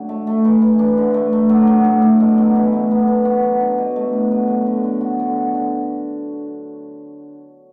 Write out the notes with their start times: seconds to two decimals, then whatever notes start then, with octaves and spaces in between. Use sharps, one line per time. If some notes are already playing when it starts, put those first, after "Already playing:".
Already playing: A2 F#3 D4
0.09 A3
0.27 A3
0.45 E3
0.62 E3
0.79 D4
0.98 D3
1.14 A3
1.33 A3
1.49 F#3
1.67 F#3
1.84 A2
2.02 A2
2.20 B2
2.38 F#3
2.55 E3
2.73 A3
2.91 B3
3.08 D4
3.25 F#4
3.43 F#3
3.60 D4
3.78 B2
3.96 A3
4.13 D3
4.31 F#3
4.48 F#3
4.67 D3
4.84 D3
5.01 F#4
5.19 D3
5.36 F#4
5.54 D3